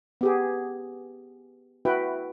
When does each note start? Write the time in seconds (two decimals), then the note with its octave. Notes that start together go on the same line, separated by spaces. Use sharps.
0.21 B3 G4 G#4
1.85 E4 F#4 B4 E5 G5